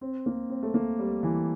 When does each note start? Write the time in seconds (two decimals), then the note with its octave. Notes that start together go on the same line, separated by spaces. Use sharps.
0.01 C4
0.26 A#3
0.50 C4
0.63 A3
0.74 A#3
0.99 G3
1.23 E3